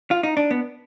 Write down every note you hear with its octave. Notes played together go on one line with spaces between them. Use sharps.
F4
D#4
D4
B3